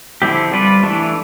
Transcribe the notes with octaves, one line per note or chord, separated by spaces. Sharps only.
D3 F3 C4 E4 G4
G3 D4 F4 B4 D5
E3 A3 D4